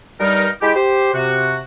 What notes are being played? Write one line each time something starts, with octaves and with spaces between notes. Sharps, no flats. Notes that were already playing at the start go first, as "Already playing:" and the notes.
G2 G3 D#4 A#4
G#3 E4 G4
G4 C5
C3 F#4